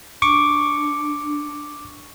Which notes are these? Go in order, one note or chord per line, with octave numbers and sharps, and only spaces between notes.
D4 C#6 D6